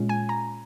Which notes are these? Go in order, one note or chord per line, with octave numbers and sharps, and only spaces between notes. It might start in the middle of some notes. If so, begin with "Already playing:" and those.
Already playing: A#2 G#3 C#4 F4
G#5
A#5